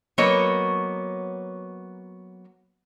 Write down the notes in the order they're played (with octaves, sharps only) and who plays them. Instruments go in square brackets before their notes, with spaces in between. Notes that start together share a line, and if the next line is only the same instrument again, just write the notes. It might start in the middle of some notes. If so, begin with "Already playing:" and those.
[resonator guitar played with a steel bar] F#3 A#3 B3 C#5 D#5